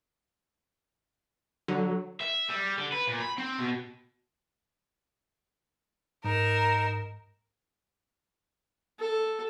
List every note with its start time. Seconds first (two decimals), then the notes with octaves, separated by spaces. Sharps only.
1.68 D3 F#3
2.21 E5
2.49 G3
2.78 D3
2.92 B4
3.07 A#2
3.20 B5
3.38 C4
3.59 B2
6.24 G#2 D#4 A#4 E7
9.00 A4